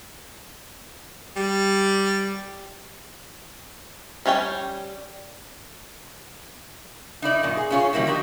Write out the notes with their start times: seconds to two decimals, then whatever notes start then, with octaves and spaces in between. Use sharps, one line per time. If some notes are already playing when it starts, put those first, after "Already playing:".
1.36 G3
4.26 G3 C#4 C#5 F#5 G5
7.22 D#4 E4 D5
7.43 F#2 A#2 D#3
7.57 G#4
7.70 C#4 D4 F4 G#4 C#5
7.93 D#3 G3 A#3 E4 F#4
8.07 F3 D4 D#4 F#4 G4